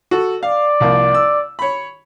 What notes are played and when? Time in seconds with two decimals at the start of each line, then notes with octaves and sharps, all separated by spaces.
0.11 F#4 A4
0.43 D5 F5
0.80 C2 F3 A#3
1.14 E6
1.59 C#5 B5